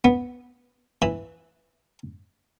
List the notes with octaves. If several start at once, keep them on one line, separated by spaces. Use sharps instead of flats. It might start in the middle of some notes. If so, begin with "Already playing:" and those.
B3
E3